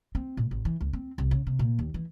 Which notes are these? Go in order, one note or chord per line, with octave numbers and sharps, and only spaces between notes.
C4
A#2
A1
E3
C#2
C4
C2
C#3
C3
A#2
D#2
E3